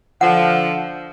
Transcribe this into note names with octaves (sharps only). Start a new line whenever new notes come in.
D3 F3 F#5